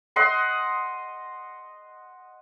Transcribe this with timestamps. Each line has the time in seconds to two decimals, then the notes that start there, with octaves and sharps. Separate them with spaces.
0.16 D#5 F#5 C6